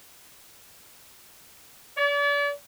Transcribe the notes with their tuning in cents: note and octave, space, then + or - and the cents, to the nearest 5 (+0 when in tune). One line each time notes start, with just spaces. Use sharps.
D5 -40